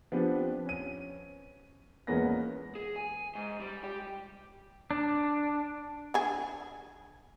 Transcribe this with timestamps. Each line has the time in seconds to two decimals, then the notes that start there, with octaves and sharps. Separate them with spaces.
0.12 F3 B3 C4 D4 G4
0.66 C#4 D#7
2.07 E2 G#3 A#3 B3 C#4 A#6
2.75 G#4
2.96 G#5
3.35 G#2
3.60 G3
3.84 G4
4.91 D4
6.14 D3 G#4